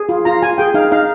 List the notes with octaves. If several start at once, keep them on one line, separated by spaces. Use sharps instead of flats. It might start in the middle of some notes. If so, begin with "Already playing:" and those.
Already playing: G#4
F4
F4 A#5
F4 G#5
G#4 G5
D#4 F5
D#4 F5